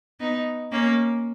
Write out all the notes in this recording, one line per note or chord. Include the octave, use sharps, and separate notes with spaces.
B3 D#4
A#3 C#4